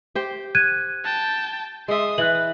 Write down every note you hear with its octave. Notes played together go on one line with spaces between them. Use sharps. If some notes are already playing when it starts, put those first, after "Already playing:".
G4 C5
F#6 G#6 D#7
G5 A5
G#3 E5 C6 D#6
E3 B4 F#6 F#7